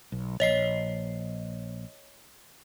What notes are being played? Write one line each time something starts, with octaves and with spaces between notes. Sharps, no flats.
B1
A#1 C#5 D#5 C7